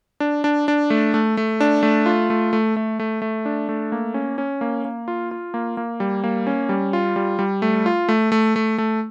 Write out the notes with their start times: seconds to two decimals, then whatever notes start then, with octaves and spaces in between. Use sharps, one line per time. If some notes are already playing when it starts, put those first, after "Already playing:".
0.20 D4
0.44 D4
0.68 D4
0.90 A3
1.14 A3
1.37 A3
1.60 D4
1.83 A3
2.06 F4
2.30 A3
2.53 A3
2.76 A3
2.99 A3
3.22 A3
3.45 D4
3.69 A3
3.92 A#3
4.14 C#4
4.38 C#4
4.61 A#3
4.85 A#3
5.08 F4
5.31 F4
5.54 A#3
5.77 A#3
6.00 G3
6.24 A#3
6.47 C#4
6.69 G3
6.93 F4
7.16 G3
7.39 G3
7.62 A3
7.86 F4
8.09 A3
8.32 A3
8.56 A3
8.78 A3